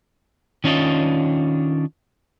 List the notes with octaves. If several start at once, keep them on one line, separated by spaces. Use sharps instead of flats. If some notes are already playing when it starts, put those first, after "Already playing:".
D#3 C#4 D4 F4 D#5